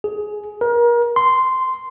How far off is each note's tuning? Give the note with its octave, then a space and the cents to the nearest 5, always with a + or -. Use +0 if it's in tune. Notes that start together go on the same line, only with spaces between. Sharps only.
G#4 +15
A#4 +35
C6 -10